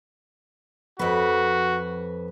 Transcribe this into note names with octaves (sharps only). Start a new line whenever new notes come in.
F2 F#4 B4